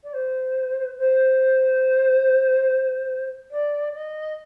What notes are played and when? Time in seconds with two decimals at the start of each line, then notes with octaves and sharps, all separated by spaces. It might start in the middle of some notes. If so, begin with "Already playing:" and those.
0.03 D5
0.13 C5
0.98 C5
3.51 D5
3.94 D#5